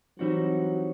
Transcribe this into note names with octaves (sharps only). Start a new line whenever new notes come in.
E3 F#3 G3 C4 D#4 F#4